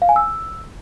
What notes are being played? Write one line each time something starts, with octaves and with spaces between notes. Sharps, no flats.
F5
G#5
E6